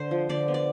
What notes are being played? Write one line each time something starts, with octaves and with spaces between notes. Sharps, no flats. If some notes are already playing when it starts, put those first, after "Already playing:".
Already playing: D3 C5
F3
D3 D5
B3
D5